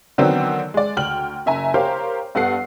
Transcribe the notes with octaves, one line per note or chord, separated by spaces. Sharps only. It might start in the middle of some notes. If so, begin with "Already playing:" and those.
D3 D#3 F#3 B3 C4 D4
G#3 D5
D2 G5 F6 F#7
F#1 E5 G#5 A#5
G4 A#4 C5 C#5 F5
G2 B3 A4 F#5 C7